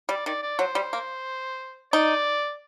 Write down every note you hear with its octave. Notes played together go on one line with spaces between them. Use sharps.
G3 D5
D#3 D5
D5
F#3 C5
G3
A#3
D#4 D5